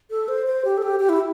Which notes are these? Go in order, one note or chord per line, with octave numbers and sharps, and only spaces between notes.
A4
C5
C5
G4
A4
G4
G4
E4